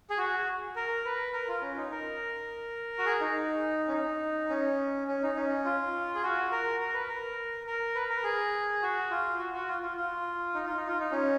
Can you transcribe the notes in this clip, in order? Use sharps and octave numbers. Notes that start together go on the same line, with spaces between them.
G#4
F#4
A#4
B4
A#4
F4
C#4
D#4
A#4
F#4
G#4
D#4
C#4
D#4
C#4
C#4
D#4
C#4
F4
G#4
F#4
A#4
A#4
B4
A#4
A#4
B4
A#4
G#4
F#4
F4
F#4
F#4
F4
F4
F4
D#4
F4
D#4
F4
D#4
C#4